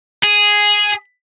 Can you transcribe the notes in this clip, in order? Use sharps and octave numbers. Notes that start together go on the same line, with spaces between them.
G#4